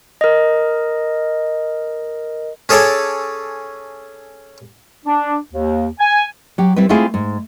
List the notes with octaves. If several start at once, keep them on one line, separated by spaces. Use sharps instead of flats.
A#4 D#5
C#4 G#4 A4 C#5 D5
D4
D#2
G#5
F#3 G4
G3 C4 E4 B4
G#3 A3 C4 E4 F4 G#4
G#2